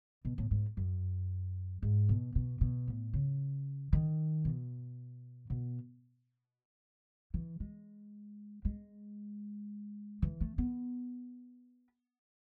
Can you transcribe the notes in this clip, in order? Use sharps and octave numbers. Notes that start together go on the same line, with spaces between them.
B2
A2
G#2
F#2
G#2
B2
B2
B2
A2
C#3
D#3
B2
B2
E3
G#3
G#3
E3
A3
B3